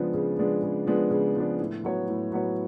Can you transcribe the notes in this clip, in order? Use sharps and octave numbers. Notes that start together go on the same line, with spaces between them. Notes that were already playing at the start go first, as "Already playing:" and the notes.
Already playing: C#3 F3 G#3 B3 D4
C#3
F3 G#3 B3 D4
C#3
F3 G#3 B3 D4
C#3
F3 G#3 B3 D4
A2
F#3 B3 F#4 C#5
A2
F#3 B3 F#4 C#5